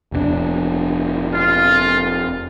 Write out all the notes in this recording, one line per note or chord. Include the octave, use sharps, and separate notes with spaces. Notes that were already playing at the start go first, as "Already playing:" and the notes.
F1 A#2 D4
F4